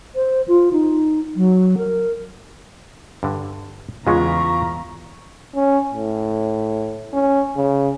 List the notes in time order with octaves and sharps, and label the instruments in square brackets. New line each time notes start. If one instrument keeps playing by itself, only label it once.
[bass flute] C5
F4
D#4
F#3
A#4
[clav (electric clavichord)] G2 D3
[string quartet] E2 A#5 [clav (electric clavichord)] C#3 G#3 B3 [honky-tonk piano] F4 [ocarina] C#6
[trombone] C#4
A2
C#4
C#3